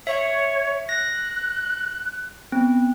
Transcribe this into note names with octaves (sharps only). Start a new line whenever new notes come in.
C#5 E5
F#6 A#6
B3 C4